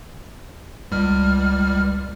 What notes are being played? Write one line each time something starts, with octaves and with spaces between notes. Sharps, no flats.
C#2 G3 F6